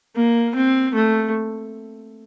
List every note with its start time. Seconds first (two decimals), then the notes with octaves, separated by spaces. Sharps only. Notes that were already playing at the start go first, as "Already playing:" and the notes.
0.16 A#3
0.55 C4
0.94 A3